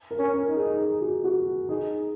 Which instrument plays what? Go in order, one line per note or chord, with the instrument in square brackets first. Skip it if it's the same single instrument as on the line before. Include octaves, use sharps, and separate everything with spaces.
[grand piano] A#4
[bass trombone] C#4
[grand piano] A#4
[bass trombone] D#4
[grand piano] G#4
G#4
F#4
F#4
[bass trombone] D#4 [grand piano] G#4